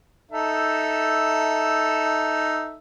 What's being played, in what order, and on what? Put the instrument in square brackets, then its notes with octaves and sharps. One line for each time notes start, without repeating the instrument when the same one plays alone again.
[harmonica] D#4 A4 E5